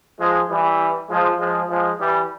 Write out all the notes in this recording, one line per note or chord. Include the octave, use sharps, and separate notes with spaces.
F3 G#3
E3 G3
F3 G#3
F3 G#3
F3 G#3
E3 G3